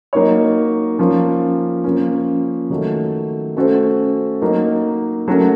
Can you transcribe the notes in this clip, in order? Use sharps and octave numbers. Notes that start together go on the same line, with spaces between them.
F#3 A#3 D#4 A#4 C#5
F3 A#3 C#4
F3 A#3 C#4
D#3 F#3 A3
A3 C#4 F#4 A4 C5
F#3 A#3 D#4
F#3 A3 C#4 F#4 A#4